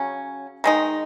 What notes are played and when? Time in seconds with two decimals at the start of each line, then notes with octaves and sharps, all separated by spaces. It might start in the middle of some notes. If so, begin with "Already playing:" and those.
Already playing: C#3 F#3 C#4
0.64 D#3 G#3 D#4